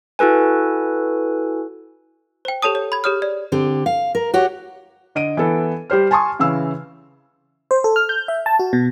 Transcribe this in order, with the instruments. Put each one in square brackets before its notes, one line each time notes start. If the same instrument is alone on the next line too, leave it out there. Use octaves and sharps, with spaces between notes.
[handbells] E4 F#4 A4 B4 G#5
[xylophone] C5 G5
G4 A4 C#5 A5 D#6
C#5
B5 G#6
G4 G#4 C#5 D#6 F6
D5
[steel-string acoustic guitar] D3 C4 G4
F5
A#4
F#4 G4 C#5
[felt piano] D3 D#5 D7 D#7
E3 B3 A4
G3 G4 C5 F6
G#5 A5 C6 C#6 D#6
C#3 E3 F5 E6
[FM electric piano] C5
A4
F6
G6
E5
A5
F#4
B2